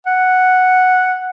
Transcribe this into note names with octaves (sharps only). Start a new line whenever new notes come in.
F#5